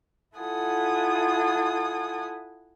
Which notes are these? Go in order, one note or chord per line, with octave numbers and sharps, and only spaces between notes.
E4 F4 A4 F#5 G#5 D#6